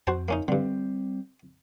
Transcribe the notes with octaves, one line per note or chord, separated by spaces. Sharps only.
F2 F#4 C5 A5
A#3 C#4 D#4
G2 D3 G3 C4